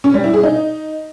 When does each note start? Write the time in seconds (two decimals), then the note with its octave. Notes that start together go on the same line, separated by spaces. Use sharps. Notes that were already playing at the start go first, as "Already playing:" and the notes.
0.04 C#4
0.14 G3
0.24 E4
0.34 G#4
0.43 D#4